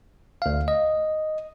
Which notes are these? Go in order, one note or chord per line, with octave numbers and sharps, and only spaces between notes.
D2 F5
D#5